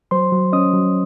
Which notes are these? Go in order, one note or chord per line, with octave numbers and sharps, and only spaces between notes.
F#3 C5 C6
F#3
C#4 D#5 D#6
F#3